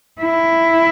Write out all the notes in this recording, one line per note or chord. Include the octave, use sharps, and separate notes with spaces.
E4